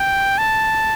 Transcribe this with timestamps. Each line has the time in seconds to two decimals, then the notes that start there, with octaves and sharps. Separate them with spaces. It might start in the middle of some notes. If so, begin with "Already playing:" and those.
Already playing: G5
0.38 A5